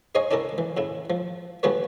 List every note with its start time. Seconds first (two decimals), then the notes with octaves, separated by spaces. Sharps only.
0.15 D#4 G#4 C5 C#5 D#5 F5
0.31 C#4 D4 E4 A4 A#4
0.58 E3
0.77 A2 C#3 E4
1.10 F3
1.63 D3 G3 F4 G#4 B4 C#5